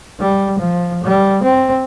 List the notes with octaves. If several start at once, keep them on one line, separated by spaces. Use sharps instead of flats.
G3
F3
G3
C4